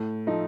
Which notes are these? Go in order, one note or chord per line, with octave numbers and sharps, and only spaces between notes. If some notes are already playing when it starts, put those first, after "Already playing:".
Already playing: A2
F3 A3 D#4